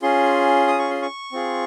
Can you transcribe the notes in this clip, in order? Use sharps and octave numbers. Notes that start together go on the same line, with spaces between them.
C#4 F4 G#4 C6
D#6
C#6
C6
C#6
C4 F4 G#4